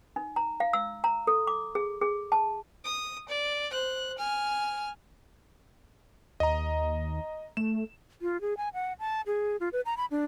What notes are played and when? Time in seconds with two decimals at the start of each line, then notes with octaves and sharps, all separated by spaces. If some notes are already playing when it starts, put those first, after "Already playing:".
0.16 D#4
0.36 A#5
0.60 F5
0.73 E6
1.04 A#5
1.27 A4
1.47 D6
1.75 G#4
2.02 G#4
2.32 A5
2.85 D#6
3.28 D5
3.71 C5 F#6
4.18 G#5 F6
6.40 D#2 D#5 A#5
7.57 A3 E7
8.22 F4
8.41 G#4
8.57 G#5
8.74 F#5
9.00 A5
9.27 G#4
9.60 F4
9.73 B4
9.86 A#5
9.97 B5
10.11 D4